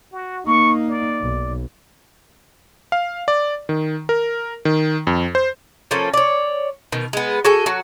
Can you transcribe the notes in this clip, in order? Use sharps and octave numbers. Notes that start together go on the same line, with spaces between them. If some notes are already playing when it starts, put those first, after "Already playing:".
F#4
A#3 D#4 C#6
D5
B1
F5
D5
D#3
A#4
D#3
F2
C5
F3 A3 A#3 C#4
C#5 D5
B2 D#3
G#3 B3
F#4 G#4 A4 G#5
F#3 F#4